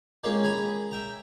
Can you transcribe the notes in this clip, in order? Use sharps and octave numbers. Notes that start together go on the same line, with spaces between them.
G#3 A#3 C4 C#4 F4 G#4
G#4 G#5 A#5 B5
E5 G5 A#5